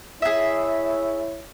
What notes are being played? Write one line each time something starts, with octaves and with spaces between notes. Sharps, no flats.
E4 G#4 C#5 E5